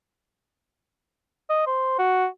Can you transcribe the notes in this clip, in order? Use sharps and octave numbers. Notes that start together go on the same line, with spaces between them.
D#5
C5
F#4